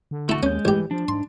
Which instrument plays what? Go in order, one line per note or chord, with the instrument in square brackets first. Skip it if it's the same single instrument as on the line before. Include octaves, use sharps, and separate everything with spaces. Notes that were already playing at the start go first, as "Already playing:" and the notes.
[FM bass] D3
[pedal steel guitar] A3 F#4 [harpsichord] E4 A5
[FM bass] D#2 [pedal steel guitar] G#3 G6 [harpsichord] C#4
[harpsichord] A1 G4 [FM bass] E3
[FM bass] F3 [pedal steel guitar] D4
[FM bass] G#2 [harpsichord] C6